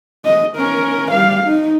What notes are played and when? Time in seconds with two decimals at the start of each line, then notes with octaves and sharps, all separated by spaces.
0.25 D#5
0.57 C#4 A#4
1.12 G3 F5
1.44 D#4